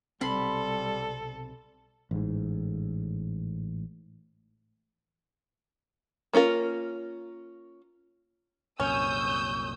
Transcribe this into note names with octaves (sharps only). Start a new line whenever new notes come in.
B1 C3 G3 C4 A4 B5 C6
A1 G#2
A#3 C#4 F4 A#4
C2 F#2 A#2 C#4 C#6 D#6 E6 G6